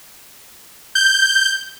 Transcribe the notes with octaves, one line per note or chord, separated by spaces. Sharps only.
G6